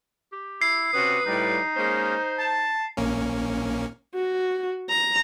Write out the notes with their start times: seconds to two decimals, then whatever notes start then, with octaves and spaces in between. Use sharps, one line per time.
0.32 G4
0.62 E4 C7
0.93 C3 C#4 F#4 B4 D#6
1.26 A2 G3 D#4
1.76 G#3 A#3 C#4 C5
2.38 A5
2.97 A#1 A#3 C#4
4.15 F#4
4.89 A#5